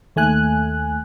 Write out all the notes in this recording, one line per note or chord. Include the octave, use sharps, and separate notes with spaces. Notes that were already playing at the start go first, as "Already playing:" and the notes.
D#2 A3 G#5 F#6